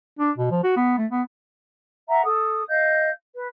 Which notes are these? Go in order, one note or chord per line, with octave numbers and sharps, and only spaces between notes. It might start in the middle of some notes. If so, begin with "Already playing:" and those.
D4
B2
F3
F#4
B3
A3
B3
E5 F#5 A#5
A4 D#6
D#5 F5 G6
B4